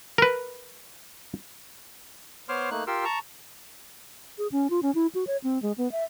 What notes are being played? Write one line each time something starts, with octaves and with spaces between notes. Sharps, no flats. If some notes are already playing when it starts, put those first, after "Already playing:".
A#4 B4
B3 C5 C#5 C6 D6 F6
A3 A#3 D#4 F#6
F4 G4 A#4 C6 E6
A5 A#5 C#6
G#4
C#4
F4
C#4
E4
F#4
C#5
C4
G#3
B3
E5